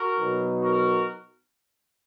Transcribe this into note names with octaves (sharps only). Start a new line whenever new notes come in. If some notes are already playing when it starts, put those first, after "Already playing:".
Already playing: F#4 A#4
B2 F#3 B3 D#4
F#4 A#4